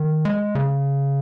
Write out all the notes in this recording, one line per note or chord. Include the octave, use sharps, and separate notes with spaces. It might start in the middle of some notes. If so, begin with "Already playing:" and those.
Already playing: D#3
G#3
C#3